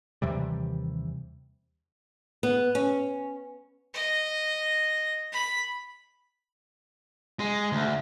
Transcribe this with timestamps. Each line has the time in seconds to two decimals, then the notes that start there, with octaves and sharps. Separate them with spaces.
0.22 D#2 C3 E3 G3
2.43 B3
2.75 C#4
3.94 D#5
5.32 B5
7.39 G#3
7.72 D2